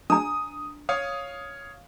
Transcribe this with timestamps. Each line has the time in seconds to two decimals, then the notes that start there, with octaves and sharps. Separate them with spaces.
0.10 D4 A#5 D#6
0.89 C#5 F5 D#6